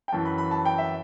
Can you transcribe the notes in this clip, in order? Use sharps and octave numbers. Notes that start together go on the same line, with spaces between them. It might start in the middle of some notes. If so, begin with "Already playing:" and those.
G5
F#2 E3 A5
B5
B5
A5
G5
E5